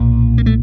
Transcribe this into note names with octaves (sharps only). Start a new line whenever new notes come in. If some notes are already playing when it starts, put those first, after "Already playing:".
Already playing: B1 A#2
A#3
A3